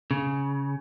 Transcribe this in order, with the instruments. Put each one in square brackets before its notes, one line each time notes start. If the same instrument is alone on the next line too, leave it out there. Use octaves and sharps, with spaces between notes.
[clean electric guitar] C#3